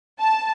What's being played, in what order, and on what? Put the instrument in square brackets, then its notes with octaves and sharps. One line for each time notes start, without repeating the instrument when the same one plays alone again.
[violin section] A5